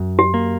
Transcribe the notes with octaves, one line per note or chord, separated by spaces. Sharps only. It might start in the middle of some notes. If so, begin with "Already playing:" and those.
Already playing: F#2
G4
A#3